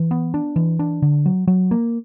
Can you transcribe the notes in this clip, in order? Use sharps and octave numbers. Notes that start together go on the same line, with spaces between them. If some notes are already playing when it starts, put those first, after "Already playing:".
Already playing: E3
B3
D4
E3
D4
D3
F#3
F#3
A#3